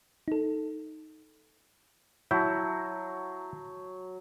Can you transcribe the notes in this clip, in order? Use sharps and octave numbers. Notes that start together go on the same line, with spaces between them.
D#4 A4
F#3 E4 A5 G6